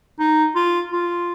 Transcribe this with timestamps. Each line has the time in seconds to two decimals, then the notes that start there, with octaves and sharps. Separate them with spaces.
0.20 D#4
0.56 F4
0.92 F4